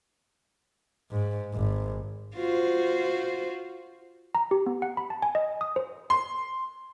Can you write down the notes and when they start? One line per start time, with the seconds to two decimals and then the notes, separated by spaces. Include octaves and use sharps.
1.11 G#2
1.54 G#1
2.35 F4 F#4 C5
4.35 A#5
4.51 G4
4.66 B3
4.82 F#5
4.97 B5
5.10 A5
5.22 G#5
5.35 D#5
5.61 D#6
5.76 C5
6.10 C6